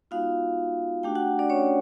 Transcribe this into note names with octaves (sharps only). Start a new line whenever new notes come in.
G#3 B3 D#4 F4 F#4 F5
A3 D4 F#4 G4 G5
F#4 F#5
D4 D5
C#4 C#5